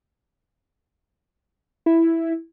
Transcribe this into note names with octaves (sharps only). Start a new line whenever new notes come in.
E4